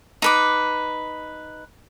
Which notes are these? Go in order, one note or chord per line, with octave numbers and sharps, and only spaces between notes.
D#4 B4 D6